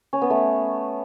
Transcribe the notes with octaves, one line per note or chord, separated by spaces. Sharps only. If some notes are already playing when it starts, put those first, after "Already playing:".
C#4
B3
A3